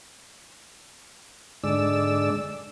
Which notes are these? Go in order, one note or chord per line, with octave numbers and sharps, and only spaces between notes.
G#2 D3 G#3 D5 E6